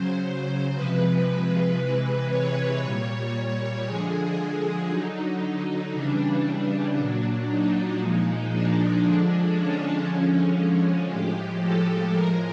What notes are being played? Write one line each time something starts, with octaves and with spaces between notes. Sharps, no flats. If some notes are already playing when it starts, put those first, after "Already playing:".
Already playing: C#3 F#3 C5
C3 F3 G#3 B4
C3 E3 G#3
C#5
A#2 G3
D3 F3 G#3 G#4
D3 F#3 D#4
C#3 E3 G3 D4
D4
A#2 F#3
D#4
A#2 F3 G#3
D4
D3 F3 G#3
C#4
D3 F3 G#3
C#4
A2 F3 G#3 G4
A4
A2 F3 G#3 A#4